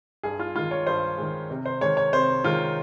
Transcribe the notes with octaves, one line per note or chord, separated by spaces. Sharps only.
G2 G#4
F4
D#3 G#3 F4
C#5
G2 C5
D#3 G#3
C3
C5
D#3 G#3 C#5
C#5
C3 C5
D#3 G#3 F4